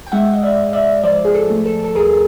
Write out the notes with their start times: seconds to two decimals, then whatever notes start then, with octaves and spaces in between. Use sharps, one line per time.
0.07 G5
0.12 G#3 E5 F#5
0.34 D#5
0.43 D5 E5
0.58 G#2
0.73 D5 E5
1.04 F3 C5 D5
1.25 G#4
1.34 A4
1.50 A3
1.66 A4
1.84 A4
1.95 D#2 G#4 A#4